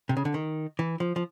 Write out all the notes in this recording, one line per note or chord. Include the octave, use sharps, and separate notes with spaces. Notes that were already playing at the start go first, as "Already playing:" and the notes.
C3
C#3
D3
D#3
E3
F3
F3